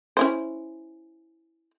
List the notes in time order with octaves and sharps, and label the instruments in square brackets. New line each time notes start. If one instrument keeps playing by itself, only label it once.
[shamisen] C#4 E4 C5